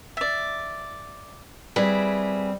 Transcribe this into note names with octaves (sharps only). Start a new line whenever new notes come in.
D5 E5
G3 C4 E4 G#4 B4